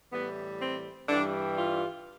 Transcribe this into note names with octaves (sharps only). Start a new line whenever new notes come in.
A2 E3 G3 B3
C4
G2 E3 G3 D4
F4